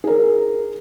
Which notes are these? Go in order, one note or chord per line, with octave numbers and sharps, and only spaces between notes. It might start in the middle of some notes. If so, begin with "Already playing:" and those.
G#4 A#4